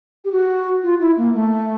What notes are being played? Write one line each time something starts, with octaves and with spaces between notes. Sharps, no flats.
G4
F#4
F4
E4
A#3
A3